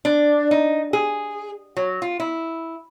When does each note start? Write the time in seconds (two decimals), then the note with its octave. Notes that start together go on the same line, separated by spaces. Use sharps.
0.05 D4
0.51 D#4
0.93 G#4
1.77 F#3
2.02 F4
2.20 E4